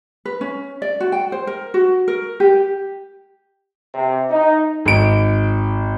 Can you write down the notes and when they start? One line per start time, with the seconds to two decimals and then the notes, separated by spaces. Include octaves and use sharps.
0.25 B4
0.41 C#4
0.82 D5
1.00 F#4
1.12 G5
1.32 C5
1.47 A#4
1.74 F#4
2.08 A#4
2.40 G4
3.95 C3
4.30 D#4
4.86 G#1 D7